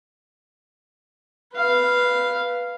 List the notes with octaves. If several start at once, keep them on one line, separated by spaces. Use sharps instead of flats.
B4 F5